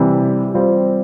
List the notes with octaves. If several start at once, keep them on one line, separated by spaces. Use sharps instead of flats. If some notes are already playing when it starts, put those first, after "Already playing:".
Already playing: C3 E3 G3
G3 C4 F4